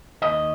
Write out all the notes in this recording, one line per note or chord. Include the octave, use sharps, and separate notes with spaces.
D#2 D#5